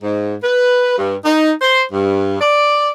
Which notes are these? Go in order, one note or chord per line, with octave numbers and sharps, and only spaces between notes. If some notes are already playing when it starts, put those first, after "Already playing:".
G#2
B4
G2
D#4
C5
G2
D5